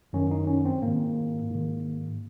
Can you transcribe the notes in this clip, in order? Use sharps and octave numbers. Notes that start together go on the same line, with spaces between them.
F#2 D#3 C#4
D#4
C#4
C4
G#2 D#3 A#3
G#2 D#3